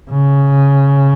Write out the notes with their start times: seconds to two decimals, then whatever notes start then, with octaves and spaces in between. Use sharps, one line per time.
0.11 C#3